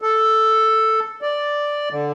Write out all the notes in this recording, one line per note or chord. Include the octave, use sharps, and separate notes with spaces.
A4
D5
D3